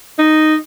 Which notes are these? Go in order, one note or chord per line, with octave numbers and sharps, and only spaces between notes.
D#4